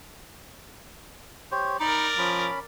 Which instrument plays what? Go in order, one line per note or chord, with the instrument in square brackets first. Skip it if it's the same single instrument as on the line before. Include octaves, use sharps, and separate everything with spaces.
[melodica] G4 C5 C#5
[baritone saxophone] D#4 [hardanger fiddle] A#4 D5 [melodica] B5
[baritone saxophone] F3 [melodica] C#4 B5